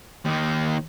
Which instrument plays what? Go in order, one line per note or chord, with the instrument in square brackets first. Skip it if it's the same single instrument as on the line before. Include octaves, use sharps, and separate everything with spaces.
[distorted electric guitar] D#2 D#3